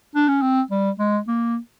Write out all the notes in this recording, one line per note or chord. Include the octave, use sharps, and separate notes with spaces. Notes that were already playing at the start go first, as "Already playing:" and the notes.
D4
C#4
C4
G3
G#3
A#3